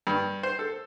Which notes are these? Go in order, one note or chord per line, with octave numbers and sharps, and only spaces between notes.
G2
C5
A4